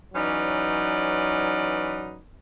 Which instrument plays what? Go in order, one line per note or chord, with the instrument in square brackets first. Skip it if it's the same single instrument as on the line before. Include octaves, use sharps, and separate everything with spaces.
[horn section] E3 F#3 C#4 D#4 B4 D5